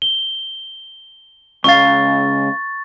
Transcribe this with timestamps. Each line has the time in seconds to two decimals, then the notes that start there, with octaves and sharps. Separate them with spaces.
0.02 G7
1.64 C#2 C#3 F5 C#6 A6